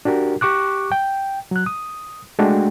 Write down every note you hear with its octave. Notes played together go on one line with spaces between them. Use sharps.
D4 F#4 G4 A#4
G4 C#6 D6 F#6
G5
F#3 F#6
D#6
G#3 A3 D4 F#4 G5